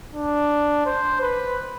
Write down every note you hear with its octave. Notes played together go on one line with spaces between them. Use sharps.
D4
C5
B4